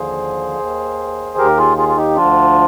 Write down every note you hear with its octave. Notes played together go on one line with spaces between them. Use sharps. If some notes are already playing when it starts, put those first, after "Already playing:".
Already playing: D#2 D3 F3 G#4 C5
D#2 D#3
D#2 D#3 G4 A#4
F4 G#4
F4 G#4
F4
D#4 G4
D2 D3 F3 D4 F4